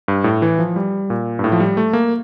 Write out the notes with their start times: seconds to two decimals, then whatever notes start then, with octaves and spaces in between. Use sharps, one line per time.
0.08 G2
0.24 A2
0.42 E3
0.59 F3
0.76 G3
1.10 A#2
1.39 G2
1.44 A2
1.52 F3
1.60 G3
1.77 A3
1.93 A#3